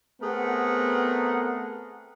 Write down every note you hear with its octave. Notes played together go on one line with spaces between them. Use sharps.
A3 B3 C4 G#4 A#4 F#5